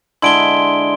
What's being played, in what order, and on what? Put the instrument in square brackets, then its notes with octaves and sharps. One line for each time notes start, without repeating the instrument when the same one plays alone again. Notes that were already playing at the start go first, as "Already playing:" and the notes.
[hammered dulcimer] D3 G#3 E4 [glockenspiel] C6 D7 G7